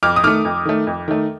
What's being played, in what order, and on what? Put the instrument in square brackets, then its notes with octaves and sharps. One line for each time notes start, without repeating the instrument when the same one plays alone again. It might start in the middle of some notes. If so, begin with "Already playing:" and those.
[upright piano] F2 D6 F6
D#6
D#3 A3 D6 F6
F2
D#3 A3
F2
D#3 A3